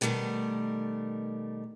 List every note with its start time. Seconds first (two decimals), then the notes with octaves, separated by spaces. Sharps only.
0.01 B2 D#3 F3 G3 A3 A#4